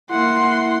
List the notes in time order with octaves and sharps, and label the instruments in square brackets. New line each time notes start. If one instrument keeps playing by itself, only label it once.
[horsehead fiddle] A#3 F#5 [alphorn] E4 [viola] C6